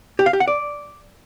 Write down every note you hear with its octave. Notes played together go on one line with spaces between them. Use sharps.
G4
F5
G4
F#5
D5